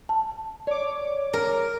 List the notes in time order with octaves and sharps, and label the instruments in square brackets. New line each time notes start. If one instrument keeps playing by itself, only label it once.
[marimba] A5
[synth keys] C#5 D6 [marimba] D5
[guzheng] A#4